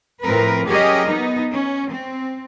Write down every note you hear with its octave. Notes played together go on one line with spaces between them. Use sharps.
A2 F3 C4 A#4 B4
F#3 C#4 G4 G#4 A#4 D#5
B3 D#4
C#4
C4